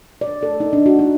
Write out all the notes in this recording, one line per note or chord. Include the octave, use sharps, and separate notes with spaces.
D5
A4
D#4
D4
F#4
D#4